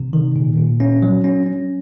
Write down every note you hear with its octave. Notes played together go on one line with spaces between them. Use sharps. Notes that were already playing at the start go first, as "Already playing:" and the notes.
Already playing: C3
D#3
A#2
A#2
C#4
F#3
C#4
C#4